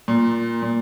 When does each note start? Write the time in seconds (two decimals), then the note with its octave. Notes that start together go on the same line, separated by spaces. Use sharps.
0.08 A#2
0.62 A#2